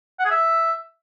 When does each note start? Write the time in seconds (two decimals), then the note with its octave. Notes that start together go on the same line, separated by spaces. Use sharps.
0.19 F#5
0.25 G#4
0.31 E5